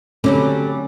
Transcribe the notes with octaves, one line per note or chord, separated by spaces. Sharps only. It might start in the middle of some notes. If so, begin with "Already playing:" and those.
D3 F#3 G3 A3 C4 C#4